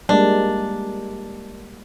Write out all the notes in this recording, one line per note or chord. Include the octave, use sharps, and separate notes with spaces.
G3 G#3 A#3 D4